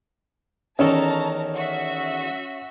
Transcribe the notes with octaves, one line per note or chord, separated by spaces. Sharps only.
E2 D#3 C#4 A4 A5 A#5
F#4 E5